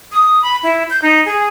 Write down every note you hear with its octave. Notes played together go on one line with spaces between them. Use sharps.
D#6
B5
E4
G6
D#4
G#4